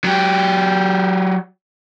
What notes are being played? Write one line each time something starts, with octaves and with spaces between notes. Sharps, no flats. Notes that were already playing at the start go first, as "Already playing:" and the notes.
F#3 G4